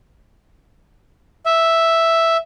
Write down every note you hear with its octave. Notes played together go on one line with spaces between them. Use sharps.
E5